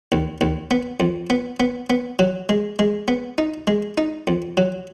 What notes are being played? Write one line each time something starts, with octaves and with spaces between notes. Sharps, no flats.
D#2
D#2
B3
F2
B3
B3
B3
F#3
G#3
G#3
B3
D#4
G#3
D#4
F2
F#3